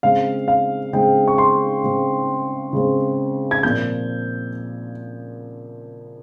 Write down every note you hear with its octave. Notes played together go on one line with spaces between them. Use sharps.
C#3 G#3 C4 F5
F5
C#3 G#3 C4 G5
C#6
C6
C#3 G#3 C4
C#3 G#3 C4
G#6
A#2 F3 C4 G6